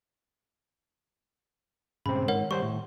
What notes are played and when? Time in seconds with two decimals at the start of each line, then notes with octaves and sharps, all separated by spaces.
2.06 G2 A#2 C#3 G#3 C4 B5
2.28 G#2 D#3 A#4 C#5 F#5
2.51 G3 C5 C#6
2.62 A2